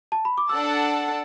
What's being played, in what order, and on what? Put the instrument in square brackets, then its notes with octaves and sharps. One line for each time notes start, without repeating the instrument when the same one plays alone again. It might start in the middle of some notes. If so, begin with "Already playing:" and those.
[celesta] A5
B5
D6
[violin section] D4 A4 F#5 A5 [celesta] E6